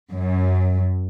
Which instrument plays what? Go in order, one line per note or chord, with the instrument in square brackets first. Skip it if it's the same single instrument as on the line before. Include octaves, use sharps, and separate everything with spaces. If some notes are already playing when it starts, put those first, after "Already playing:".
[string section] F#2